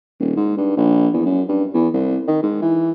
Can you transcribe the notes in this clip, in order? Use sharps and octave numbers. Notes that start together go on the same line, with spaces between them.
D#1
G#2
G2
A#1
E2
F#2
G2
E2
C2
D#3
G#2
E3